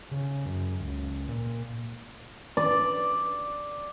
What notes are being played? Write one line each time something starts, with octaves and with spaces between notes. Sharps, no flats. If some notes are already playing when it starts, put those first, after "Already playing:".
C#3
F#2
C#2
A#2
D5